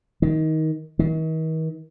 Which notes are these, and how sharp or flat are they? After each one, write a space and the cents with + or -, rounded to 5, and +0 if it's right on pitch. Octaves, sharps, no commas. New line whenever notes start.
D#3 +20
D#3 +45